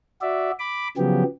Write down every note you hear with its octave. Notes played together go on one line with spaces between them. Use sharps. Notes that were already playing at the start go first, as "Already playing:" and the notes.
F#4 D5 E5
B5 D6
C#3 F3 F#3 B3 G4